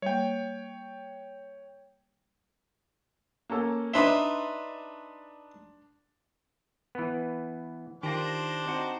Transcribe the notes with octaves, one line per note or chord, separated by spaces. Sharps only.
G3 A#3 C#5 G5
A#3 C#4 A4
D4 D#4 B4 E5 C6 G7
E3 B3
D#3 D4 F4 G4 C5 D6 A#6
C4 D#4 F#4